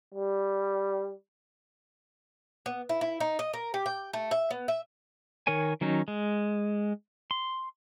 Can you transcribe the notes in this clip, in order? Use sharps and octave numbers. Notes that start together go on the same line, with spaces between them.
G3
B3
E4
E4
D#4
D#5
A#4
G4
G5
A3
E5
B3
E5
D#3 A#4 C#5 G#5
D#3 F#3 C#4 D#4
G#3
C6